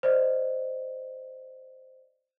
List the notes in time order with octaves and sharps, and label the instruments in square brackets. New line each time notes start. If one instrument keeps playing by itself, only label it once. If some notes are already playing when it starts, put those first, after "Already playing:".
[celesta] C5 D5 D#5